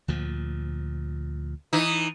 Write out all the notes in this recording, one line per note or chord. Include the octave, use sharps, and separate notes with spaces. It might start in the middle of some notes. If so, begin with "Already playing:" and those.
D2 A#2 F3
E3 D#4